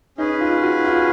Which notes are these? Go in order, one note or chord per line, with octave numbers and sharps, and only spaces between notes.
C#4 D#4 G#4 B4
F4
F#4
F4